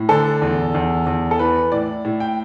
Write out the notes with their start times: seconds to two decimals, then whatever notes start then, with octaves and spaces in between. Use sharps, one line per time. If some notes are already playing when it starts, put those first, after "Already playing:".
Already playing: A2
0.09 D3 A4
0.42 E2
0.74 E2
1.06 E2
1.31 A4
1.39 E3 B4
1.72 A2 D5
2.05 A2
2.20 G5